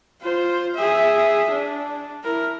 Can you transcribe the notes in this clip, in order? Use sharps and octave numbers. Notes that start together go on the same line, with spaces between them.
F4 C5
G#4 E5
D4
E4 A#4